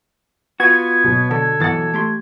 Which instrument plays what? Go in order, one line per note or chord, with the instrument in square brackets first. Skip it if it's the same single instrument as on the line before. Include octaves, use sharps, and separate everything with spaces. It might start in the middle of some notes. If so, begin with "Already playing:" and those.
[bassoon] B3 [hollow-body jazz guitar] F4 F#4 [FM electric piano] G#6
[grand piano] B2 F#3
[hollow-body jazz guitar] D3 [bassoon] A4
[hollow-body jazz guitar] B2 F#3 F#5 [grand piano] E3 A6
[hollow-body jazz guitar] A3 G4 C6